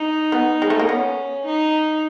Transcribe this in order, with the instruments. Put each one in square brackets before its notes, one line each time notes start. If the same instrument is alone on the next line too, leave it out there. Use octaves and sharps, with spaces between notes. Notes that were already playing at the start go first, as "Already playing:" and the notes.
Already playing: [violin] D#4
[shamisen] B3
G#3
A3
A#3
[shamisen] B3 [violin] C#4
[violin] D#4